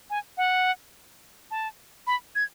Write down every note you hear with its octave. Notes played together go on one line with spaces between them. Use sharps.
G#5
F#5
A5
B5
G#6